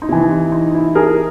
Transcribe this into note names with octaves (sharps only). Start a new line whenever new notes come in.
D#4
C3 E3 E4
D#4
D#4
E4
G#4 A#4